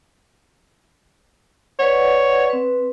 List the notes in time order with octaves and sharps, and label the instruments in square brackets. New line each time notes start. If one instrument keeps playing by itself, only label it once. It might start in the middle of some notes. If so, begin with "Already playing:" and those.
[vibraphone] B4 D5 F#5 [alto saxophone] C#5
[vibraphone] C4 B4